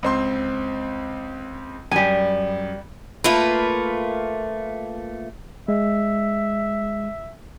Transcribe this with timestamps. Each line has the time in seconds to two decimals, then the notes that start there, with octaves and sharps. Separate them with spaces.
0.03 C#2 C4 C6
1.92 F#2 G3 G#5
3.24 A3 A#3 F4 B4
5.68 G#3 E5